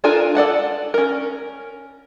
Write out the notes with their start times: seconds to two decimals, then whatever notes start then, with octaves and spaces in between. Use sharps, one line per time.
0.04 D4 F4 A4 A#4 G#5
0.35 A4 D5 F#5 A5
0.94 C#4 A#4